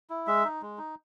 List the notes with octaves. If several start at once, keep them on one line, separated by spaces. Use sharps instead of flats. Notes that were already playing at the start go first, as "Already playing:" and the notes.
E4
G#3 E5
D#4
G#3
D#4